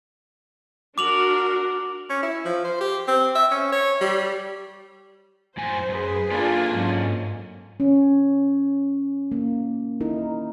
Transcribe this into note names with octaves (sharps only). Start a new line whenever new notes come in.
D4 F#4 A#4 D6 F7 F#7
C#4
E4
F3
C5
G4
C4
E5
C#4
C#5
G3
F#2 A2 C5 G#5
F#2 G#4 B4
A#3 D4 F4 A4 G#5
G#2 F#3 C#4
C#4
A#3
D#4 E4 A#4